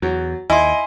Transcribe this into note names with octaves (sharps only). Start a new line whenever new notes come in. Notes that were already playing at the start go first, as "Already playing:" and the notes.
E2 F#3
D#2 E4 D#5 G#5 C6